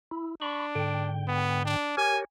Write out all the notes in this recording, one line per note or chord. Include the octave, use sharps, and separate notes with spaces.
E4
D4 B5 C#6
G#2 D3 G5
B3
D4
G4 A#4 C#5 G#5